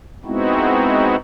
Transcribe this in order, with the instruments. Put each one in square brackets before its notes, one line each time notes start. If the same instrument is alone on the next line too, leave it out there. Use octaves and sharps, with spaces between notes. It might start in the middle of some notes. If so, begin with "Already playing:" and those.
[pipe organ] G#3 B3 C4 D#4 E4 F#4